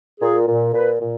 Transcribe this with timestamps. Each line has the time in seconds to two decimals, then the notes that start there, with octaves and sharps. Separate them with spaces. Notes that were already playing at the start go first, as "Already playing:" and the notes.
0.21 A#2 G#4
0.47 A#2
0.73 A#2 B4
1.01 A#2